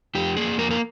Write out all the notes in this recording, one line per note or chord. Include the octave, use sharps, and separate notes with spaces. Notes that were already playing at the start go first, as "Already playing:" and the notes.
F2 G4
A#3 G#4
F2 A#4
A#4